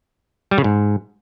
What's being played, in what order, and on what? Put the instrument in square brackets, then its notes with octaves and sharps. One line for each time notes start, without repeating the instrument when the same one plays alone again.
[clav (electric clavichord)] G3
C#3
G#2